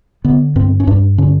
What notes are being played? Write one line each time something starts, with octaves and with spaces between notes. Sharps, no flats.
D3 B3
G2 C4
C#4
G2 D4
D3 C#4